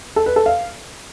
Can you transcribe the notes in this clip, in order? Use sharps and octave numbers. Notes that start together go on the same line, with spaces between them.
A4
B4
A4
F5